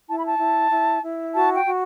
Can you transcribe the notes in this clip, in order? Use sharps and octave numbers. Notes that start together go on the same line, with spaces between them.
E4 A5
B5
A5
E4
E4
E4
F#4 A5
G5
F#4